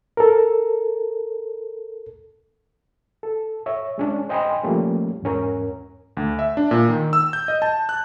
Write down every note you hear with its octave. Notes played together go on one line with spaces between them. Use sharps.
A4 A#4
A4
C#5 E5
G#3 C#4 D4
C5 D#5 G5 G#5 B5 C6
F3 G3 A3 A#3 C#4
E2 G#2 C#4 A#4
D2
E5
D4
A#2
D#3
E6
G6
D#5
A5
F#6